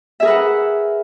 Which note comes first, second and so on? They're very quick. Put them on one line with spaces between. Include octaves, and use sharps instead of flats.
E5 G#4 A#4 B4 F#5